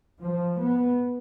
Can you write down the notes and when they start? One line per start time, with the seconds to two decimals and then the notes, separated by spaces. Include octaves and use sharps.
0.23 F3
0.60 B3